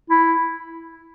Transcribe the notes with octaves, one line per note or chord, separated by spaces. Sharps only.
E4